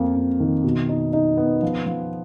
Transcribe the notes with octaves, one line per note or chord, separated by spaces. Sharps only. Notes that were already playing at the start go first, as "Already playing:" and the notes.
Already playing: F2 A#3
F2
D#3
B2
D#4
D#4
B3
F3
F3